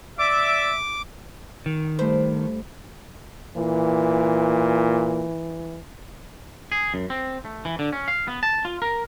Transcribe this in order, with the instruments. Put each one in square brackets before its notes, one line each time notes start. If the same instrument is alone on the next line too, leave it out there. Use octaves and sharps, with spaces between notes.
[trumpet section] D5 E5 [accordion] D6
[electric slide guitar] D#3
[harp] G2 A3 B5 [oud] C5
[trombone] A#2 [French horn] E3
[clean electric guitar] G#4
F#2
C4
A3
E3
D3
C#4
F5
B3
A5
F4
A#4